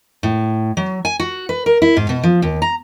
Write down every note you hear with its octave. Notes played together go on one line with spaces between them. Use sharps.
A2
F#3
G#5
F#4
B4
A#4
E4
G#2
B2
F3
D#2
A#5